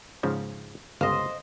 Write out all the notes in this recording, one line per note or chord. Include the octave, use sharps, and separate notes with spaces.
G#2 C#3 F3
G1 C#2 C5 D#5 F5